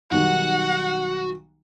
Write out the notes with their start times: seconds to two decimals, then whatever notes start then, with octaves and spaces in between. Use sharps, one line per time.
0.12 B1 D#3 G3 F#4 F#5